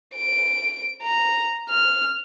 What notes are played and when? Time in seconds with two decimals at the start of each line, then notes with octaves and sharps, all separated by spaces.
0.15 D7
1.03 A#5
1.70 F6